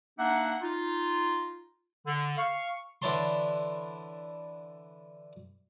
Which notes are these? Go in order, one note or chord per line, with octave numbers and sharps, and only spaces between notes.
A#3 D4 D#4 E5 F#5
D#4 F4
D3
F5 C#6
D3 E3 B4 C#5 A5 C6